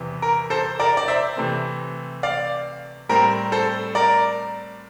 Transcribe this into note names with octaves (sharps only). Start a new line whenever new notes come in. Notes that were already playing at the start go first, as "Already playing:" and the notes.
Already playing: E2 C3 E3
A#4
A4 C5
A#4 D5
D5
C5 E5
C3 E3 A3 C4
D5 F5
A2 G3 C4 A#4
A4 C5
A#4 D5